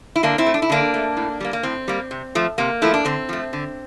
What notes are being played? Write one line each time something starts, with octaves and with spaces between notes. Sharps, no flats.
E4
D3 A#3 D4
C4 E4
A3
D4
E4
D3 A#3 D4
A3
A2
G3 A#3
A#3
A2 C4
G3 A#3
C3
F3 A3
C3 A#3
F3 A3 E4
D4
D3 C4
F3 A3
D3